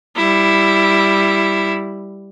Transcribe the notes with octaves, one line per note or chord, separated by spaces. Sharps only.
G3 E4